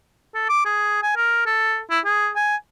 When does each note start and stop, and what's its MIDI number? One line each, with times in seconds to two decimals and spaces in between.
0.34 0.47 69
0.49 0.63 86
0.65 1.00 68
1.02 1.15 80
1.16 1.43 70
1.46 1.80 69
1.90 2.00 64
2.05 2.30 68
2.36 2.56 80